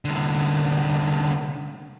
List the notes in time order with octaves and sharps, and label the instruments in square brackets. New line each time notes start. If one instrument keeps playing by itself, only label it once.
[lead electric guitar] C2 D3